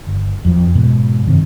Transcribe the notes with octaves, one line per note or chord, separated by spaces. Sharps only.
G1
F2 F3
G#2 B2 E3
G2 C3 D#3